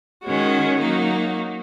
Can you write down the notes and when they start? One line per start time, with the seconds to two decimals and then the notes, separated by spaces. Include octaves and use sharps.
0.24 D#3 G#3 C#4 F#4
0.80 F#3 A#3 D#4 F#4